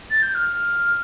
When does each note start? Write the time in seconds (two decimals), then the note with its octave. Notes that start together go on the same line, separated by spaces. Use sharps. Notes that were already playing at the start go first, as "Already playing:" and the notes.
0.10 A6
0.22 G6
0.35 F6